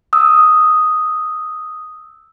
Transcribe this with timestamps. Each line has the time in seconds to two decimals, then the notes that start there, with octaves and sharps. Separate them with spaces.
0.13 D#6 E6